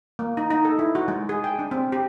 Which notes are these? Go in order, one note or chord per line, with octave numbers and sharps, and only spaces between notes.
A#3
D#4
D#4
A4
E4
F#4
G#3
G#4
G5
D4
C4
G4